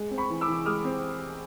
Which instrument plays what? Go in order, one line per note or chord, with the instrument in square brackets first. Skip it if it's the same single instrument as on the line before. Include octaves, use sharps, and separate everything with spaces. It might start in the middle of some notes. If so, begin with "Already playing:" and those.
Already playing: [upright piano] G#3
C4
B5 C#6
E3
D6 E6
E3
G#3 D#6 F6
C4